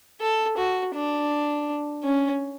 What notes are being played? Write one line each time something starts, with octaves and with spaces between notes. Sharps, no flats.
A4
F#4
D4
C#4